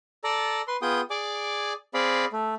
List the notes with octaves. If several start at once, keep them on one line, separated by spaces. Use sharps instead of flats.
A4 D5 A#5
B4 C6
B3 F4 G#4 G5 D#6
G#4 D5 G#5 D6
C4 G#4 D5 F5 B5
A3